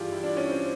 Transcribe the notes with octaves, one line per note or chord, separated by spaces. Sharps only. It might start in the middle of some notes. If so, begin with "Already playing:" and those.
Already playing: G2 E3 F4 G4 G#4
E4
D4
C#4
C4